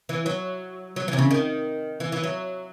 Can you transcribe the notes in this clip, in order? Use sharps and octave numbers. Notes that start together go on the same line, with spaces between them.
E3
F#3
F#3
E3
C3
C#3
D#3
E3
E3
F#3